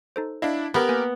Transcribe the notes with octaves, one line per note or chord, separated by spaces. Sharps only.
D#4 A4 C5
D4 E4 D#5 F5
B3 G4 A#4
A#3 B4 G#5